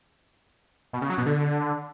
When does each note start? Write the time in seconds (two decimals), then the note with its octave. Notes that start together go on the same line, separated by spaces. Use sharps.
0.93 B2
1.01 C#3
1.10 F#3
1.18 B2
1.26 D3